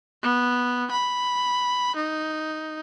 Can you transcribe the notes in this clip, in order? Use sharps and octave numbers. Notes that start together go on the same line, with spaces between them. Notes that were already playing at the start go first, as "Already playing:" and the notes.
B3
B5
D#4